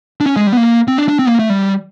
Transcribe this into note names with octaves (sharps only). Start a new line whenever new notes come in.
D4
C#4
G#3
G3
B3
A#3
C4
D4
D4
C4
B3
A#3
A3
G3